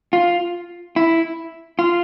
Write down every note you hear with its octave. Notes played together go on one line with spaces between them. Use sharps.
F4
E4
F4